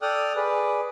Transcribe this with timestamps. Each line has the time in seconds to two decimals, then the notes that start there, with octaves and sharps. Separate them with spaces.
0.02 A4 D5 G5 D#6 F6 F#6
0.36 G#4 B4 D5